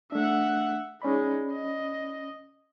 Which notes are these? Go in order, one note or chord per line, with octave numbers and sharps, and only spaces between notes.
A3 D4 E5 F#5
G#3 C#4 D#4 D5 B5
D#5